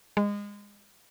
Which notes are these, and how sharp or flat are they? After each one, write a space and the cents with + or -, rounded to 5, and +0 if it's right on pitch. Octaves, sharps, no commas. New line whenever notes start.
G#3 -25